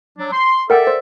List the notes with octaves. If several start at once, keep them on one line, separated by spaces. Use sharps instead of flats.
F#3 D4
C6
A4 A#4 D5 E5 F#5 G5
C5